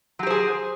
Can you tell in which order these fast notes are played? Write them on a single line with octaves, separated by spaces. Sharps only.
F#3 G4 C5 G#4